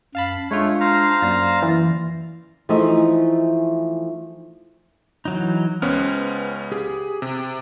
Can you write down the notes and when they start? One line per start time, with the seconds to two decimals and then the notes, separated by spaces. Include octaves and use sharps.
0.15 F#2 F5 A5 B5
0.51 G#3 A3 D4 F4 C#5
0.80 C5 F5 A#5
1.22 F#2 A#3 D5
1.62 E3
2.69 E3 F3 A3 D#4 G#4
5.25 E3 F#3 D#4
5.82 C#2 B3 C#4 B4 C5 F6
6.72 G4 G#4
7.22 C3